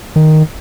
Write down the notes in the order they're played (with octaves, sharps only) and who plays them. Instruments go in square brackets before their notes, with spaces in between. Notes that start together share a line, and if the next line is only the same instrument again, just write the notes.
[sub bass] D#3